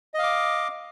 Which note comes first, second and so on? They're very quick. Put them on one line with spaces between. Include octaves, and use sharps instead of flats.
D#5 F5 D6